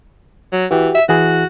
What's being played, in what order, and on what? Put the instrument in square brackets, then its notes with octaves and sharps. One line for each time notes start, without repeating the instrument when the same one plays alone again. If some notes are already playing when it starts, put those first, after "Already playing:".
[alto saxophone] F#3
[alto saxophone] E3 [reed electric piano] F#4 G4
[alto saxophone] E5
[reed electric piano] E3 E4 G#4 [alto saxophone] F#4